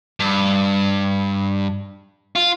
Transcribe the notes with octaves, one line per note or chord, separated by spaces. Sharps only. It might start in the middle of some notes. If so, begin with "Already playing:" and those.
G2
F4